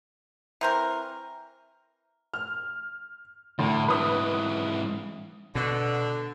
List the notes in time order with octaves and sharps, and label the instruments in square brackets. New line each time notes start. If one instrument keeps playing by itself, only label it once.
[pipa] E3 C4 A#4 [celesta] E5 A#5 C#6
[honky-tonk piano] F6
[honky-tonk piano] D2 [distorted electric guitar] A2
[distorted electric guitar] G#2 E3 [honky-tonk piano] B4 D#6
[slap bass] B2 [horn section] D3